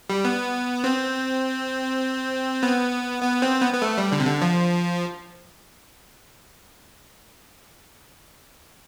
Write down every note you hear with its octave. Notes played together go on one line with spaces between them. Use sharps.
G3
B3
C4
B3
B3
C4
B3
B3
A3
G3
D3
C3
D3
F3